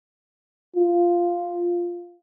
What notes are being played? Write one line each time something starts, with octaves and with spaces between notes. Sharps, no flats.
F4